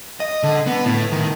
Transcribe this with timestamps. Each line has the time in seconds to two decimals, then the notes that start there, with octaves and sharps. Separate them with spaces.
0.20 D#5
0.43 D3
0.67 B3
0.84 A2
1.12 D#3